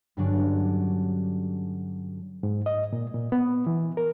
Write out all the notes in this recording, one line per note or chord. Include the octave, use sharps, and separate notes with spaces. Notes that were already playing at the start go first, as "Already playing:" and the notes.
G2 D3 F#3 C#4 D4
G#2
D#5
A#2
A#2
B3
E3
A#4